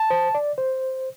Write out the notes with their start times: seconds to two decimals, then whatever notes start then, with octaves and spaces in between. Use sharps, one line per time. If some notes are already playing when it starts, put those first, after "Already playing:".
Already playing: A5
0.10 C5
0.35 D5
0.58 C5